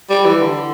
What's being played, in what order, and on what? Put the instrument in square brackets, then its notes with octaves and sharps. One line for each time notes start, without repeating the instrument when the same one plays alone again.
[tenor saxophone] G3
E3
D3